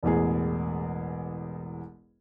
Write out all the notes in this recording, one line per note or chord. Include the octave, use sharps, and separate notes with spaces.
E1 A1 E2 G#4